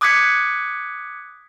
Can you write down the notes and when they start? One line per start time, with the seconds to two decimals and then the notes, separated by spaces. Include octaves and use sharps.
0.01 D6 D#6 F#6 G#6 B6 C#7